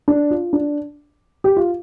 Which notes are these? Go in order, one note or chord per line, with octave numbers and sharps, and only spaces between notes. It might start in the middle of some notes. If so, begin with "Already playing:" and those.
D4
F4
D4
G4
F4